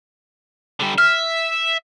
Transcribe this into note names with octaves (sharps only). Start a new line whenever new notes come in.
D3 G3
E5 F6